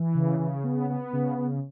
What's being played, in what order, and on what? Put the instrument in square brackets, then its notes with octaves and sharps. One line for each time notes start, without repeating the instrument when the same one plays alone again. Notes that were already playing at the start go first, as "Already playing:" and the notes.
Already playing: [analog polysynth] E3
C#3
C#3
B3
B3
C#3
C#3